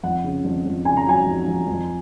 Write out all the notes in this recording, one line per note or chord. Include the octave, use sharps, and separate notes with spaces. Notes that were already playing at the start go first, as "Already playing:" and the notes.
F2 F#5
C#3
F2
F2
C#3 G#5
A#5
F#3 G#5
F2
F2
F2